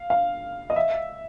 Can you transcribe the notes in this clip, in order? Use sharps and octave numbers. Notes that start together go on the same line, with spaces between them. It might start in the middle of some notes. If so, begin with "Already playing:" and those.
Already playing: F5
F5
D#5
E5